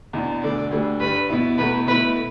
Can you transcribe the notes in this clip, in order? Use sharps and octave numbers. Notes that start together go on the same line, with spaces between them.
E2 B2 B3 D4
D2 D3 A3 D5
D2 D3 G3
G2 G3 D4 B4
B2 B3 E4
E2 B2 A3 B4
B2 A3 E4 B4